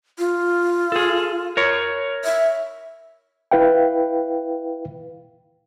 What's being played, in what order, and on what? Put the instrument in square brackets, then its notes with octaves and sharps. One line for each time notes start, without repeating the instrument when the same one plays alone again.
[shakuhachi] F4
[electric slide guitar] G#4 A4
A#4 C#5
[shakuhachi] E5
[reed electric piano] E4 B4 F5 G5